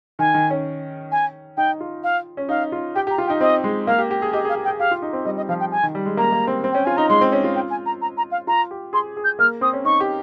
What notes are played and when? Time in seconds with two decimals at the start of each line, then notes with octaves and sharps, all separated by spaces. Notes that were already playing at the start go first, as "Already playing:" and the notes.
0.19 D#3 G#5
0.34 D#3
0.50 C#4
1.12 G#5
1.57 D#4 G5
1.80 F4
2.03 F5
2.37 C#4
2.49 D#4 F5
2.72 F4
2.95 G4 G5
3.07 G4 A#5
3.18 F4
3.26 G5
3.30 D#4
3.41 C4 D#5
3.64 G#3
3.87 A#3 F5
3.99 G4
4.11 G4
4.22 G#4
4.33 G4 D#5
4.45 G#4 F5
4.56 G4
4.64 G5
4.68 G#4
4.79 G4 F5
4.91 F4
5.02 D#4
5.13 C4
5.25 G3 D#5
5.37 D#5
5.49 F3 F5
5.60 G5
5.71 G#5
5.83 D#3
5.95 G3
6.06 G#3
6.17 A#3 A#5
6.32 A#3
6.47 C4
6.64 C4
6.72 C#4 G5
6.85 F4 G#5
6.97 D#4 A#5
7.09 G#3 C6
7.21 C4
7.32 C#4
7.44 F4
7.55 G5
7.70 G#5
7.86 A#5
8.01 A#5
8.17 A#5
8.31 F5
8.47 F4 A#5
8.71 G4
8.93 G#4 C6
9.17 G#4
9.24 G6
9.39 A#3 F6
9.61 C4 D#6
9.73 C#4
9.85 D#4 C#6
10.00 G4